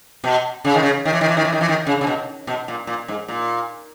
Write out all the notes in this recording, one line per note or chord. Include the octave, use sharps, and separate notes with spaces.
B2
C#3
D#3
C#3
D#3
E3
D#3
E3
D#3
E3
D#3
E3
D#3
C#3
C#3
B2
B2
A#2
A#2
G#2
A#2